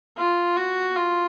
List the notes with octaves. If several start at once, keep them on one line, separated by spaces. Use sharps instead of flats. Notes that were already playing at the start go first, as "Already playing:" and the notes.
F4
F#4
F4